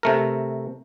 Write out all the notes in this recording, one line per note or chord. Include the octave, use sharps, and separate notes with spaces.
C3 A3 A#4